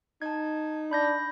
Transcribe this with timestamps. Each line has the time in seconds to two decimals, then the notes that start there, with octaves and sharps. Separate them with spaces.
0.22 D#4 A5 G#6
0.91 D4 B5 G6 A#6